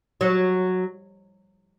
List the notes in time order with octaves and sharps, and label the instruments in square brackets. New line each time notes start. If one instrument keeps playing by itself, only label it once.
[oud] F#3